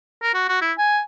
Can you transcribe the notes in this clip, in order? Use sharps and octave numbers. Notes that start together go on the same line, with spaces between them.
A#4
F#4
F#4
E4
G#5